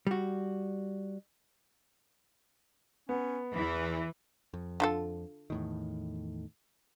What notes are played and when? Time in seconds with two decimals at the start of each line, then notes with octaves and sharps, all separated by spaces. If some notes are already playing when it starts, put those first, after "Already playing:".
0.07 G3 F#4
3.09 B3 C#4
3.54 E2 E3 B4
4.54 F2
4.80 D3 F4 A4
5.50 E2 A2 D#3